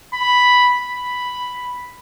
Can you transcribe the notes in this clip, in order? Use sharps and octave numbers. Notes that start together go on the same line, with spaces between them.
B5
B5